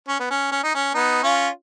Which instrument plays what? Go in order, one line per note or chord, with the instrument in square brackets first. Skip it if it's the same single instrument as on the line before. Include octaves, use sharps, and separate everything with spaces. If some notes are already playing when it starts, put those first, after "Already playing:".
[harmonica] C#4
B3
C#4
C#4
D#4
C#4
B3 D#4
C#4 F4